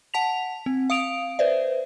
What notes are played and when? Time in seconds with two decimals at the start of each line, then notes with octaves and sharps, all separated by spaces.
0.14 F#5 A5 B6 F7
0.66 C4
0.90 F5 D#6 D7 F7
1.39 B4 C5 D5 E5